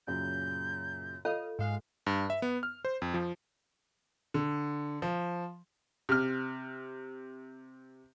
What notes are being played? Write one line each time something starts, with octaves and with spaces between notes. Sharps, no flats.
F#2 A#2 C#3 G6
F4 A4 C#5 D#5 F5
G#2 G#3 F5
G2
E5
B3
F6
C5
F2
F3
D3
F3
C3 F6